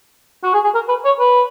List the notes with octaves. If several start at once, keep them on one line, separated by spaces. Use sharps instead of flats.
F#4
G#4
G#4
A#4
B4
C#5
B4